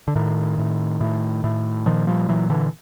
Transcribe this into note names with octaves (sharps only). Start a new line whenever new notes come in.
D3
A2 D#3
A2
A2
A2
A#2 D#3 F3
F3 G3
A#2 E3 F#3
D3 E3